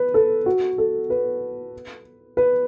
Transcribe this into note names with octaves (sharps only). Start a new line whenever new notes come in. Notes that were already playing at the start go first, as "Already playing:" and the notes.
Already playing: B4
A4
F#4
A4
B4
B4